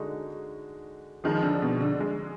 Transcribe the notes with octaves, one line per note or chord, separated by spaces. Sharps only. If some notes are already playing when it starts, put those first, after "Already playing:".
Already playing: D3 G#3 D#4 F#4
D#3 F3 G#3 D#4
D3
B2
D3
G#3